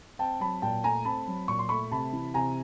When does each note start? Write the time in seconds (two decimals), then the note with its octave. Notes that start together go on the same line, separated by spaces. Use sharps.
0.19 C4 G5 A5
0.40 F#3 A5 B5
0.62 A#2 G5 A5
0.84 A3 G#5 A#5
1.05 C4 A5 B5
1.28 F#3
1.48 A#2 C#6
1.59 C6
1.69 A3 B5 C#6
1.91 C3 A5 B5
2.13 E3
2.34 C3 G#5 A#5